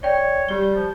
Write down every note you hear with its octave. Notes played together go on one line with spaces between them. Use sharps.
C#5 D5 G5
G3 G4 G7
F3